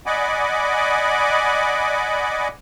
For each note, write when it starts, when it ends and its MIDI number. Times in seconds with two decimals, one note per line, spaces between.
0.06 2.48 74
0.06 2.48 75
0.06 2.48 78
0.06 2.48 80
0.06 2.48 83
0.06 2.48 86